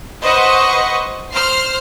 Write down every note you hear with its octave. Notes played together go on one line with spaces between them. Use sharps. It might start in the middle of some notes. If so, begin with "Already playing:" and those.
B4 C5 D#5 F#5 C#6
C5 F6 C7